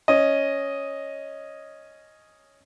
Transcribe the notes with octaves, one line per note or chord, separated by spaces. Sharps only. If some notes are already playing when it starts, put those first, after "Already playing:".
C#4 D#5